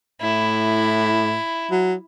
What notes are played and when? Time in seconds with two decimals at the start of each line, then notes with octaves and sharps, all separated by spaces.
0.22 A2 E4
1.71 F#3